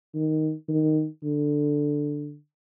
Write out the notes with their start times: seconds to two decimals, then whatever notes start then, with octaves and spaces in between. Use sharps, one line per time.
0.15 D#3
0.69 D#3
1.23 D3